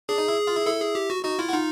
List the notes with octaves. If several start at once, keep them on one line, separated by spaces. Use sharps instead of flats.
D4 G#4
D#4
E4
F4
E4
E4 A4
G#4
G4
F#4
D#4 F#4
E4 F4
F#4
D#4 F4